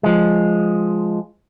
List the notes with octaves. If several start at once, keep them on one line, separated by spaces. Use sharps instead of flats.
F3 G#3